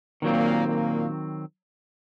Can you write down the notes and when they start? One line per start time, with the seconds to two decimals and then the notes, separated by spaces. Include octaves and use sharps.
0.22 A#2 D#3 F#3 A#3 C4
0.65 A#2 A#3